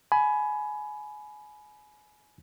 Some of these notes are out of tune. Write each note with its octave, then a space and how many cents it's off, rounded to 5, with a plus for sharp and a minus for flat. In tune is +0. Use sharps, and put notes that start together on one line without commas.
G#5 +25 B5 +0